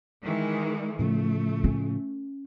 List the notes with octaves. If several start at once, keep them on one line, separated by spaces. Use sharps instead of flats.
D#3 E3 G#3
A2 C#3 F3 A3
C#4